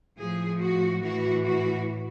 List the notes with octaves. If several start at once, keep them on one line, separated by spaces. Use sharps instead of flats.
A2 F3 G#4
F#4
A2 E3 F#4
F#4